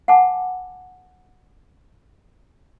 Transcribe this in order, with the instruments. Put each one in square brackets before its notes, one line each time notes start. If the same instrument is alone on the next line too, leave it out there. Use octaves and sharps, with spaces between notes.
[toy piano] F#5 G#5 A5 D6